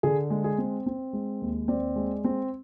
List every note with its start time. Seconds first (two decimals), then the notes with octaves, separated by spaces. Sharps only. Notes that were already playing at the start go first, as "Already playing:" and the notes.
0.03 D3 G#4
0.30 G#3
0.44 G#4
0.58 C4
0.86 C4
1.13 G#3
1.41 D#2
1.68 C4 D5
1.96 G#3
2.24 C4